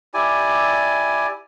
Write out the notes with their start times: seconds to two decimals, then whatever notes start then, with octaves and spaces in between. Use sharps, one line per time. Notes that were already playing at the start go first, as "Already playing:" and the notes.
0.14 E4 G4 D5 G#5